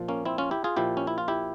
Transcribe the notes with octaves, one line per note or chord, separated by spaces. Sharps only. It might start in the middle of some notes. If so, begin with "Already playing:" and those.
Already playing: A#2 F3
A#3 C#4
C4 E4
C#4 F4
E4 G4
F4 G#4
A#2 F3 E4 G4
C#4
E4
F4
E4 G4